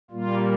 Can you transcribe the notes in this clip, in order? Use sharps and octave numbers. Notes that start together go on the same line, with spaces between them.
A#2 G3 A#3 F4